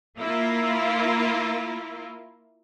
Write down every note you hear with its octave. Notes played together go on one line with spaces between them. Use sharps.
A#3 E4 F4 A#4